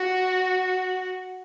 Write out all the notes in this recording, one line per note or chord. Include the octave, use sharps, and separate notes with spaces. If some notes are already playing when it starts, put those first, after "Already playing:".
Already playing: F#4